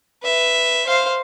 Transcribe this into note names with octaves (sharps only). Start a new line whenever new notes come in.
B4 E5
C5 F5